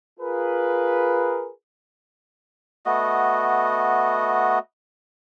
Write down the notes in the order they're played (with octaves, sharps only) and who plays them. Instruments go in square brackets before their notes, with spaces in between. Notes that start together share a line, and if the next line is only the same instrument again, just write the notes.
[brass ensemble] F4 G#4 A#4 B4
[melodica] A3 B3 F#4 D#5